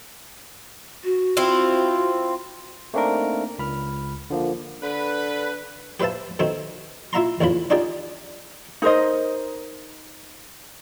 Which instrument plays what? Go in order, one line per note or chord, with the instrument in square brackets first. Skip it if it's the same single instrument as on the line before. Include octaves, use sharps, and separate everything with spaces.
[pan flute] F#4
[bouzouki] C4 E4 F4
[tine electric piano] A3 A#3 C4 D4 D#4 A#4
C#2 B5 F6
D3 F3 A#3
[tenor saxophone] D3 [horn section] B4
[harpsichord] G4 B4 C5 E5 F5 A5
B2 D#3 A3 C4
E4 F4 E5 F5 A#5 C6
A1 E2 C#3 E3 F4 B5
D4 D#4 F4 G4 G#4 D5
[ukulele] D#4 A#4 C5 D#5